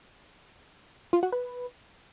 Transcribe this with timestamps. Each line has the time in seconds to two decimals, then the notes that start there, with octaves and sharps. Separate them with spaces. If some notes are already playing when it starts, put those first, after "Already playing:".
1.13 F4
1.23 F#4
1.32 B4